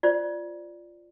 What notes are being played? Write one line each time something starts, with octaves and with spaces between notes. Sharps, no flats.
F4 C5 D5